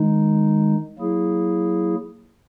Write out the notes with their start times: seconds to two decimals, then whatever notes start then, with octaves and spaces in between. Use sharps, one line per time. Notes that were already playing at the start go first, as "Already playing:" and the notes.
Already playing: D#3 G#3 D#4
0.98 F#3 A#3 E4 G#4